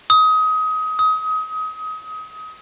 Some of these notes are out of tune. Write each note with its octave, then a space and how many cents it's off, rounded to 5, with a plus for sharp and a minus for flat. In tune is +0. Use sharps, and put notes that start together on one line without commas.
D#6 +25
D#6 +30